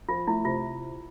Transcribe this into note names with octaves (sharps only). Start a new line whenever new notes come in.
F3 F4
A3 E4
C3 F4